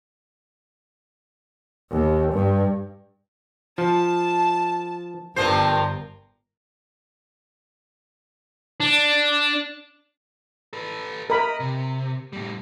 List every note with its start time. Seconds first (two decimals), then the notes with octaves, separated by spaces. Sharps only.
1.91 D#2
2.33 G2
3.78 F3 A5
5.36 G1 G2 F3 A#4 C5
8.80 D4
10.73 A4 B4
11.30 A#4 D#5 B5
11.60 C3
12.33 A2 G3